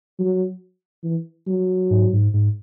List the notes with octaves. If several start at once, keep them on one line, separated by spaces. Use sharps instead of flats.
F#3
E3
F#3
G#2
G#2
G#2